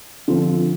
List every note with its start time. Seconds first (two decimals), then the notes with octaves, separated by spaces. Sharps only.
0.28 D3 F3 C4 F4